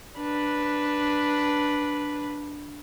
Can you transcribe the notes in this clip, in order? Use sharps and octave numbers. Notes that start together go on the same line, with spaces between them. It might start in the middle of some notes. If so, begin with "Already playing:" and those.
D4 B4